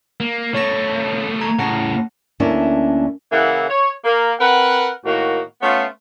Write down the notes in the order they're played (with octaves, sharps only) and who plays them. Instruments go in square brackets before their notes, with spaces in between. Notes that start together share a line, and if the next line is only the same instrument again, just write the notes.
[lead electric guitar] A#3
[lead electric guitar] A3 B3 [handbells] C#5 C#6 A#6
[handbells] A#5 G#6
[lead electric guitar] A2 C#3 [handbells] F#5 A5 A#6
[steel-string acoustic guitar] D2 A#3 C#4 D4 E4 E5
[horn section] C#3 E3 A#3 E4 F#5
C#5
A#3 A#4
C4 A#4 B4 F#5
A2 D#3 A#3 F#4
A3 B3 C#4 F4